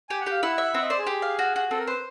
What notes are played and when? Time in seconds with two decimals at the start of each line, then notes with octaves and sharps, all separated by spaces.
0.09 G4 G#5
0.21 F#5
0.26 G4 F5
0.43 E4 F#5
0.58 E5
0.74 C4 F#5
0.82 D#5
0.90 C5 D5
0.98 G#4
1.07 G4
1.22 F5
1.39 F#4
1.56 F#4
1.71 C4 A4
1.80 A#4
1.87 B4 C5